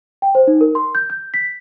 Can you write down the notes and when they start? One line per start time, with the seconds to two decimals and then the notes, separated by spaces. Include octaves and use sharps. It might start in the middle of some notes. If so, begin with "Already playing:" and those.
0.22 G5
0.35 C5
0.48 D#4
0.61 A#4
0.75 C6
0.95 G6
1.10 G6
1.34 B6